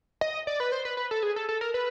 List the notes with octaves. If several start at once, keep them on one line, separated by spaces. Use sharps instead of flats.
D#5
D5
B4
C5
B4
B4
A4
G#4
A4
A4
A#4
B4